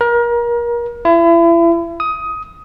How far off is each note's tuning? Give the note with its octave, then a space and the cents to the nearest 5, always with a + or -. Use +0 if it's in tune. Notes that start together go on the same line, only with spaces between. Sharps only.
A#4 +30
E4 +35
D#6 +15